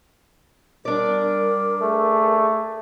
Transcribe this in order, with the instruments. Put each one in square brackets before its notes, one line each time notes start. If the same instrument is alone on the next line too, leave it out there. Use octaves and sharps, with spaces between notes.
[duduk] G3 [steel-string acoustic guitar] D4 D5 [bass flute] A#4
[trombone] A3 [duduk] G#4